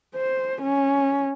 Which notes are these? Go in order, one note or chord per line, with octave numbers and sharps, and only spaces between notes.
C5
C#4